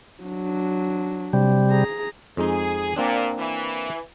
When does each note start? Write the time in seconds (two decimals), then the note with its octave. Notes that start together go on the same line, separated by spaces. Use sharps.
0.23 F#3 D4
1.33 C3 G3
1.70 G#4 A#5
2.37 F2 G#3 D#4 G#4
2.96 A#2 A#3 C4 D4
3.37 E3